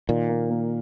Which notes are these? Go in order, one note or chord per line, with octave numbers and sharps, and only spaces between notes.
A#2 D#3
A#3
A#3